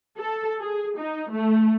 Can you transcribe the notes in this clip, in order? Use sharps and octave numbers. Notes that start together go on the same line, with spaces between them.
A4
G#4
D#4
A3